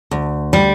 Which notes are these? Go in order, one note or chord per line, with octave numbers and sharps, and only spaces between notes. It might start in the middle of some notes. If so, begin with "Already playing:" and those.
D2
G3